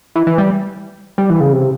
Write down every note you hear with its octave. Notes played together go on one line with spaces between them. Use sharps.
E3
E3
G3
G3
E3
C#3
C3